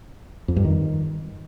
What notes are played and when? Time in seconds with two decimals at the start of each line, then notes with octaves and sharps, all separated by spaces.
0.48 F2
0.56 G2
0.65 D#3